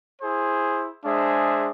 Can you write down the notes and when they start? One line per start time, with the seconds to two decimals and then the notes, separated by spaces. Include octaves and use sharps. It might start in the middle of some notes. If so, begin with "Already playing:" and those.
0.21 E4 G#4 C5
1.04 G#3 D4 G#4 C5 E5